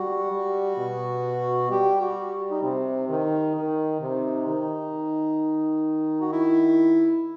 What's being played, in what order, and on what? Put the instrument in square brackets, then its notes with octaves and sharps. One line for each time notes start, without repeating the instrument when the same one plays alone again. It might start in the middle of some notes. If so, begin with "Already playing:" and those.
Already playing: [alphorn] G3 [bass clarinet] F#4
[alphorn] G3
B2
[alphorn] G3 [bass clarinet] G4
[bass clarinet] F#4
D#4
[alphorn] C3 [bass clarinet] C4
[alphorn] D#3
[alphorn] D#3 [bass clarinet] D#4
[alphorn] C3
D#3
[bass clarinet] F#4
E4